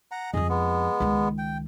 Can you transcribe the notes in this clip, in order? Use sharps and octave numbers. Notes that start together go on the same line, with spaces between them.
F#5 A#5
F2 F3 G#4 D#5
G#3 B3
C#2 D#3
G5